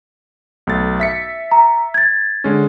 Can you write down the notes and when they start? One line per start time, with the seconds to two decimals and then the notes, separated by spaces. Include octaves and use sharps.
0.67 B1 A3 A6
1.00 E5 B6 C#7
1.51 A#5
1.94 G#6 A6
2.44 D3 G#3 C#4